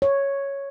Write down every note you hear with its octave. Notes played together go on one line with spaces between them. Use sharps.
C#5